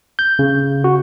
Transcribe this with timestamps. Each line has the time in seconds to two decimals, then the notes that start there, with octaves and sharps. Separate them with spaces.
0.19 G6
0.39 C#3
0.84 F#4